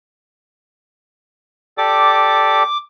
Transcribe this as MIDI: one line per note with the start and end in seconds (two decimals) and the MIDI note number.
1.78 2.63 67
1.78 2.63 69
1.78 2.63 74
1.78 2.77 86